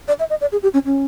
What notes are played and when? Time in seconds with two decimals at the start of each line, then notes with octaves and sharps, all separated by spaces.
0.08 D5
0.19 E5
0.30 D#5
0.41 D5
0.52 G#4
0.63 G4
0.74 C#4
0.85 C#4